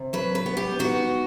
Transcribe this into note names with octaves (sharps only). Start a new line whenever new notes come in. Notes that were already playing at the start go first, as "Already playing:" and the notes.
Already playing: C3
F#3 B4
B4
B3
G4
D#4 F#4